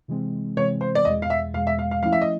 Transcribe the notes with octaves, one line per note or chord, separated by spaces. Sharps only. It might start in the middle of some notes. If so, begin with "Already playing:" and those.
C3 E3 G#3 C4
C3 E3 G#3 C4 C#5
C5
D5
E2 B2 G#3 D#5
F5
E5
E2 B2 G#3 F5
E5
F5
F5
F3 A3 C#4 E4 F5
E5
D#5